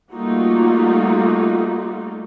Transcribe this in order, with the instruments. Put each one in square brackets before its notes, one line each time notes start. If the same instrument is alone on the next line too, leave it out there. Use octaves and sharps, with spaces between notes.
[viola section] G3 A3 A#3 D#4 F4 F#4